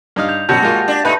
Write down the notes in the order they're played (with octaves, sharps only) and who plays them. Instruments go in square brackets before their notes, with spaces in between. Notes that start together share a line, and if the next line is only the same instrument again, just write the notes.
[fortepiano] G2 D#4 F5
[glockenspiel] G6 F7
[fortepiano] F#2 B2 F#3 [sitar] G3 F#4 [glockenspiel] A5 G6 A#6
[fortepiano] G#3 A#3 F4
[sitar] D4
[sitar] A2 A3 D#4 [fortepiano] B4